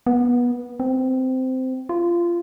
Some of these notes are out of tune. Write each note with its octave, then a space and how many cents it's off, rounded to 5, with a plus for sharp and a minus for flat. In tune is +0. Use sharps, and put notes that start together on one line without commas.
B3 -20
C4 -15
F4 -20